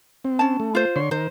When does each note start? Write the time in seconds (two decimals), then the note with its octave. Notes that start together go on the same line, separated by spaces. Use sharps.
0.24 C4
0.39 C#4 A5
0.60 A3
0.75 F4 C5
0.96 D3 C#5 C6
1.11 D#3 A#4 C5